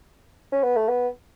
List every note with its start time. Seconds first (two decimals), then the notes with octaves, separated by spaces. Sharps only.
0.52 C#4
0.63 B3
0.77 A3
0.88 B3